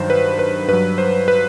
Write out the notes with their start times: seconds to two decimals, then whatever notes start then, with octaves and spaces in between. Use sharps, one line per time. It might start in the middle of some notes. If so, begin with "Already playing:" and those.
Already playing: G2 D#3 F#3 C5
0.10 B4
0.39 B4
0.68 G2 B4
0.73 F#3
0.98 C5
1.28 B4